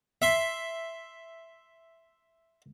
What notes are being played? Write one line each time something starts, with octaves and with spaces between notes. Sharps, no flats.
E5 C6